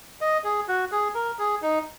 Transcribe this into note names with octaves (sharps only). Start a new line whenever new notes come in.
D#5
G#4
F#4
G#4
A#4
G#4
D#4